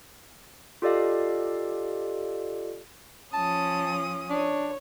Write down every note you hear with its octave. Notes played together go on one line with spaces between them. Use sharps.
F4 G4 A4 D5 D#5 F5
F3 C#4 A5 D#6
D4 C#5